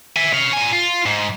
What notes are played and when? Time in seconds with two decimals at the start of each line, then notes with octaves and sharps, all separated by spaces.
0.16 E5 G#5
0.33 C#5 F5
0.53 A#2 G#5
0.73 F4
1.06 G#2